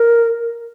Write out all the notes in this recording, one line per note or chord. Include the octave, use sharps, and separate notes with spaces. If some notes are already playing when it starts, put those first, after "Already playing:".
Already playing: A#4